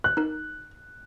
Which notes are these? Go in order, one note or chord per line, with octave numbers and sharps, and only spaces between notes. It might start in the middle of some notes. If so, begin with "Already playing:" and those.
F#6
D#4 A#4